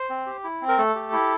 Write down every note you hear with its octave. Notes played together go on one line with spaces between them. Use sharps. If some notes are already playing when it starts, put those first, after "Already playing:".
Already playing: C5
C4
G4
E4
C4
A#4
A3 A4
G4
E4